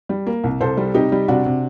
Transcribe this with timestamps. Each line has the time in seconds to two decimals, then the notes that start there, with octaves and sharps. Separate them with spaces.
0.09 G3
0.27 A#3
0.44 C2
0.61 C2 A4 C5
0.77 G3
0.94 C3 D#4 G4
1.12 G3
1.28 C3 D4 F#4
1.46 C3